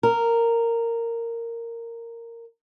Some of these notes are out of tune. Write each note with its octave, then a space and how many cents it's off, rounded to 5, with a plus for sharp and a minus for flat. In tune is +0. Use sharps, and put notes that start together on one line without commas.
A#4 -10